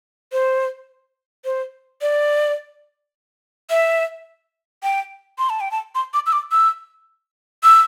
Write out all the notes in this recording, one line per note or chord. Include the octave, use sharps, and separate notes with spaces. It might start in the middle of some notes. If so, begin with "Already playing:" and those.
C5
C5
D5
E5
G5
C6
A5
G5
A5
C6
D6
E6
D6
E6
E6